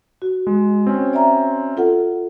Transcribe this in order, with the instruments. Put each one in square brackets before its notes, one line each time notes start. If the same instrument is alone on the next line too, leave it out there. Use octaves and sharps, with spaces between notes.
[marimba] F#4
[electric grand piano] G#3
C4 C#4
[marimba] D5 E5 A#5
F4 A4 F#5